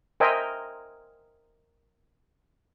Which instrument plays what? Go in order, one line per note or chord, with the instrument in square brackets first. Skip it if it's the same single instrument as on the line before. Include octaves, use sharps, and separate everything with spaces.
[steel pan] A#4 C5 D#5 E5 G5 G#5